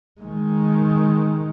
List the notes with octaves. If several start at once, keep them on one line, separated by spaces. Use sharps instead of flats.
D#3 G#3